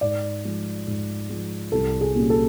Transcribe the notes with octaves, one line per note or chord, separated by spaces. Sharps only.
G#2 D5
F3 G#3
G#2
F3 G#3
C2 A4
G#4
A#2 G3 A#3 C#4
A4